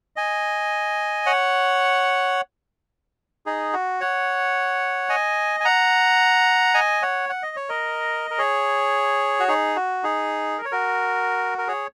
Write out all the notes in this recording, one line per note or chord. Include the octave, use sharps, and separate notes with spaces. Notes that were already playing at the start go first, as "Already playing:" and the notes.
D#5 G#5
C#5 F#5
D#4 G#4
F#4
C#5 F#5
D#5 G#5
G#5
F#5 A#5
D#5 G#5
C#5 F#5
F#5
D#5
C#5
A#4 D#5
A#4
G#4 C#5
F#4
D#4 G#4
F#4
D#4 G#4
A#4
C#5
F#4 A#4
A#4
G#4 C#5